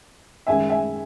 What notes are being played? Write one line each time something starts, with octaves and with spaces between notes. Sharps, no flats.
F#2 D#3 G#3 E5 G#5
E5 G#5